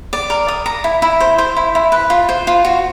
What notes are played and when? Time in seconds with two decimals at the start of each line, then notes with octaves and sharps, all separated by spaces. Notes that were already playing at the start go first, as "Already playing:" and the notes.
0.13 D5
0.30 A#4
0.48 D#6
0.66 A#5
0.84 E4
1.02 E4
1.20 C5
1.38 C5
1.57 E4
1.75 E4
1.92 B4
2.10 F4
2.29 C5
2.47 F4
2.65 F#4